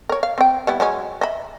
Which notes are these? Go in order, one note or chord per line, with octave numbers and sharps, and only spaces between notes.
A#4 C#5
F5
C4 G5
G3 B3 E4
F#3 G#3 C#4
D#5 E5 B5